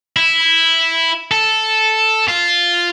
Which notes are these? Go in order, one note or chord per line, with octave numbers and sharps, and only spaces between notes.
E4
A4
F4